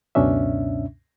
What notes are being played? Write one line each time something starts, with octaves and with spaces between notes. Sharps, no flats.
C#2 F#2 B2 C#4 D4 E5